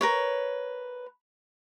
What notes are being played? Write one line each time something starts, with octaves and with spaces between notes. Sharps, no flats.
A#4 B4 C#5